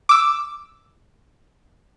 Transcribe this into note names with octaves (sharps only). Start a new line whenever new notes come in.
D6 E6